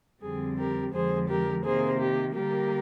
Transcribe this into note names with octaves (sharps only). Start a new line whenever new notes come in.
F2 D3 G3 C4 G#4
G4 A#4
F2 D3 F3 G#3 G#4 C5
G4 A#4
C3 D#3 A#3 G#4 C5
G4
D3 G3 A#3 G4 A#4